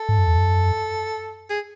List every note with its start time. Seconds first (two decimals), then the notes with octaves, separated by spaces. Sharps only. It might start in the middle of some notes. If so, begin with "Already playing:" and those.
Already playing: A4
0.09 G#2
0.18 F#2
0.27 E2
0.38 F#2
1.50 G#4